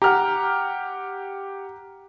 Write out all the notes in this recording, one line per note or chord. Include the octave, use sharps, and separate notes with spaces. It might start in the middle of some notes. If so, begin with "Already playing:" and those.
G4 F#5 A#5 F6